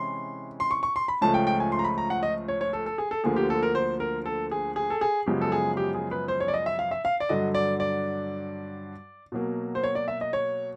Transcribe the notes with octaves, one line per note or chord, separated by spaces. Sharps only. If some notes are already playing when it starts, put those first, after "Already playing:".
Already playing: C3 E3 G#3 C#4 E4 C6
C6
C#6
C#6
C6
B5
C#2 C#3 F3 A3 A5
G5
G5
G#5
C6
A#5
B5
A#5
F#5
D#5
C#5
C#5
A4
A4
G#4
A4
D2 D3 F3 A#3 G#4
G4
A4
A#4
C5
A#4
A4
G#4
G#4
A4
G#4
F#2 C#3 F3 G#3 B3 G4
A4
G#4
G4
G#4
B4
C5
C#5
D5
D#5
E5
F5
E5
F5
D5
G2 D3 F#3 D#5
D5
D5
B2 F#3 A#3
C5
C#5
D5
E5
D#5
C#5